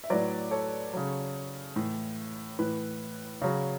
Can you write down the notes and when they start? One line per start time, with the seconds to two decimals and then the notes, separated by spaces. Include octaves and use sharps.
0.04 E5
0.10 A2 F#3 B4 D5
0.51 A4 C#5
0.94 C#3 F#3
1.76 A2 E3
2.59 A2 E3 B4
3.42 C#3 F#3